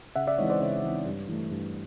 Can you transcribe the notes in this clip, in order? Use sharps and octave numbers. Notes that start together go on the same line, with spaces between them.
C#3 E5 F#5
D5 E5
E3 G#3 C4 D#4 C#5 D#5
C5 D5
C#3 C#5
E3 G#3 C4 D#4
G2
E3 A3
G2